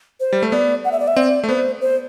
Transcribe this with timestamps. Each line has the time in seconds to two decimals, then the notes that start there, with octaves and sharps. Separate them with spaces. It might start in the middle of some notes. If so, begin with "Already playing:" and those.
0.20 C5
0.33 G3
0.43 A3
0.52 B3 D5
0.85 F#5
0.92 E5
0.99 D5
1.08 E5
1.16 C4 D5
1.43 A3
1.49 B3 C5
1.81 C5